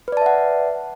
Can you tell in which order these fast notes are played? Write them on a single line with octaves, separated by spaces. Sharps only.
B4 D5 A5 E5 F#5